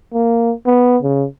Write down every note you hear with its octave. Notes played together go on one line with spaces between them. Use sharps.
A#3
B3
C#3